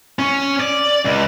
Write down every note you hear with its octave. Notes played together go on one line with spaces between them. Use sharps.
C#4
D5
C#2